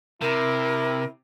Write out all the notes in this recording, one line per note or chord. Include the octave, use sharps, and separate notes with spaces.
C3 E4 A#4